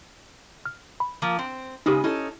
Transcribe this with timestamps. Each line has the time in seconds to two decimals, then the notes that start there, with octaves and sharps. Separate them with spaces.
0.66 F6
1.00 B5
1.22 F3 A#3 F4
1.39 C4
1.86 C#3 G#3 B3 D#4 G4
2.04 C#4 D#4 E4 A4